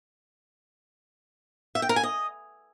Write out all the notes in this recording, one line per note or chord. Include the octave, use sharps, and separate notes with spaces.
E5
G5
A#4
G#5
D#5